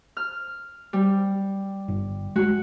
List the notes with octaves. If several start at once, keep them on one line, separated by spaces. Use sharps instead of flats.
F6
G3
G1
G#3 F#4